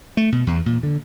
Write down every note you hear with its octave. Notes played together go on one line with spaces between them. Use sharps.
A3
B2
E2
A#2
D3